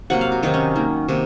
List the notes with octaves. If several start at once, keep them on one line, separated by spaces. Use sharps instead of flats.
C3 F#3 A#3 F#5
F5
F#4
C3 D#3 F#3 D#4
C#4
D#3 A#3
C3 D#3 A#3